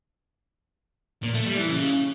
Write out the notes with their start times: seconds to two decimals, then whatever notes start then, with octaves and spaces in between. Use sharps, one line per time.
1.23 A#2
1.34 A3
1.46 G3
1.57 E3
1.68 C#3